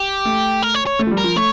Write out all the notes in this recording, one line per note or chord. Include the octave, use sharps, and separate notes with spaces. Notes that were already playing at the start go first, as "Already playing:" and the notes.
Already playing: G4
A3
A#4
C#5
C#5
A3
F3
G3
A#4
F3
A3 C#5